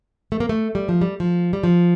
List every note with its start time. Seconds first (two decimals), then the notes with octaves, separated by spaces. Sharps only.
0.32 A3
0.40 A#3
0.49 A3
0.75 G3
0.89 F3
1.02 G3
1.20 F3
1.53 G3
1.63 F3